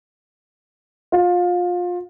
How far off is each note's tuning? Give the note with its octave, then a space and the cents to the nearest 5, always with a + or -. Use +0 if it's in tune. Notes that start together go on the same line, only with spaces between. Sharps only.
F4 +25